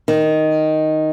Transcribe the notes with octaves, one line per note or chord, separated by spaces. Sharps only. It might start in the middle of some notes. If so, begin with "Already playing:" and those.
D#3